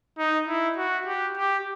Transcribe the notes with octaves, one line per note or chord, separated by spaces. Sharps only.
D#4
E4
F#4
G4
G4